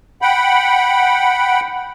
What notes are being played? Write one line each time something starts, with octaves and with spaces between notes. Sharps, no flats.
F#5 G5 B5